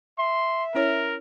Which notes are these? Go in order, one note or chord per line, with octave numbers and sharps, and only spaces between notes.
E5 C6
C#4 E4 A#4 C#5